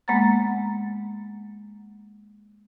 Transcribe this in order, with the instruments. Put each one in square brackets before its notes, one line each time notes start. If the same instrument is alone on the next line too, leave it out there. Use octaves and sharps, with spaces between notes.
[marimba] G#3 A#3 B3 F#5 A#5 A6